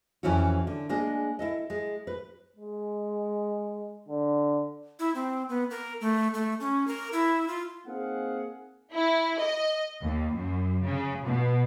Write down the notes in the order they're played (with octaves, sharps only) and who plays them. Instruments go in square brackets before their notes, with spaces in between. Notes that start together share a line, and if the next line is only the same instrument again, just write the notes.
[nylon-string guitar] F2 E3 C#4 E4 F#4
D3
G#3 A#3 D4 G#4
E4 A4 D#5
G#3
B4
[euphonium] G#3
D3
[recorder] E4
C4
B3
A#4
A3
A3
C#4
A#4
E4
F4
[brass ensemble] A#3 C4 D#4 G#4 F5 F#5
[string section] E4
D#5
D#2
F#2
C#3
B2